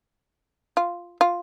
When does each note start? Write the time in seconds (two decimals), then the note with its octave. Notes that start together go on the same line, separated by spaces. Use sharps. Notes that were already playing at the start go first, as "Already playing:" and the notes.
0.77 F4
1.21 F4